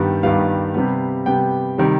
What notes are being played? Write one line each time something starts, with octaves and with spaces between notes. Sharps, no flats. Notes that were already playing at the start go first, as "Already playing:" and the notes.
Already playing: G2 D#3 G3 B3
G2 D#3 G3 B3 F5
C3 G3 B3
C3 G3 B3 G5
C3 D#3 G3